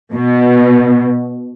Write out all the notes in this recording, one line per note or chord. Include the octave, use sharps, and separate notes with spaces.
B2